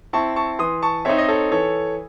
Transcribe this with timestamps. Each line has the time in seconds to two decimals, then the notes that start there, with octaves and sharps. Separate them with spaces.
0.13 C4 E4 A5 C#6
0.36 A5 C#6
0.59 E3 C6 D#6
0.82 A5 C#6
1.05 C4 D#4 C#5 E5
1.18 D#5
1.28 A4 C#5
1.51 E3 A4 C#5